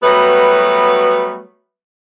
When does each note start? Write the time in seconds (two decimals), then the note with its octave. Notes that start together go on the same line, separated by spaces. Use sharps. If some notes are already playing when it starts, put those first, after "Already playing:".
0.02 F#3 G3 A3 B3 F#4 B4